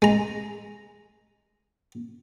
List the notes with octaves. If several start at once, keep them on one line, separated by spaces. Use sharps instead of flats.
G#3 A#5